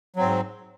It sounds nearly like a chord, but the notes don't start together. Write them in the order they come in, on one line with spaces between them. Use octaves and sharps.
F#3 C4 G#2